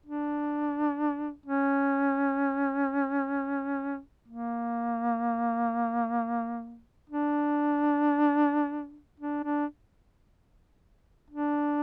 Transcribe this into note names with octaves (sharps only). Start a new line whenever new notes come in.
D4
C#4
A#3
D4
D4
D4
D4